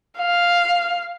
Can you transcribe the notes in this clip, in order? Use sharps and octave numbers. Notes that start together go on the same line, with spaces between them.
F5